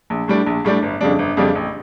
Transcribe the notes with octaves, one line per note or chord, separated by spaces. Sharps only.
A#1
A2 G3 D4
A#1
A2 G3 D4
G1
F2 C#3 G3 D4
G1
F2 C#3 G3 D4
A1